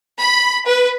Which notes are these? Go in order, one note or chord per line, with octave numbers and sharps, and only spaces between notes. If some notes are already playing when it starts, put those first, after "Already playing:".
B5
B4